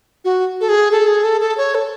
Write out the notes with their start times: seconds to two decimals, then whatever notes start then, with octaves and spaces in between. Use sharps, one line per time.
0.25 F#4
0.61 A4
0.69 G#4
0.91 A4
1.08 G#4
1.24 A4
1.41 A4
1.57 C#5
1.75 A4